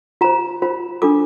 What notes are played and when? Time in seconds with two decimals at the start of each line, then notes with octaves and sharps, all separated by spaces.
0.21 F4 C5 A#5
0.62 F4 C5
1.02 D4 F4 A4 D6